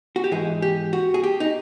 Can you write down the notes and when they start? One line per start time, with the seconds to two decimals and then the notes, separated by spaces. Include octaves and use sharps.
0.16 F#4
0.24 G4
0.31 G#2 E3 G#3 G#4
0.62 G4
0.93 F#4
1.14 G#4
1.23 G4
1.40 D#4